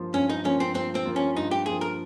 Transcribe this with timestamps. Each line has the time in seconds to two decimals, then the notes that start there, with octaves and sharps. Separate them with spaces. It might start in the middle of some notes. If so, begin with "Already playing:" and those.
Already playing: G2 F3 A#3 F4
0.14 G2 C#4
0.29 D#4
0.45 F3 A#3 C#4 F4
0.60 C4
0.75 G2 C4
0.95 C4
1.05 F3 A#3 F4
1.16 C#4
1.36 G2 D#4
1.51 G4
1.66 F3 A#3 F4 G#4
1.81 A#4